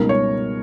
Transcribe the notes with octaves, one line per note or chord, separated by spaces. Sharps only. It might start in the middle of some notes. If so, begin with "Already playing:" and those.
Already playing: C#2 B2 G3 A#3 D#4 A#4
C#5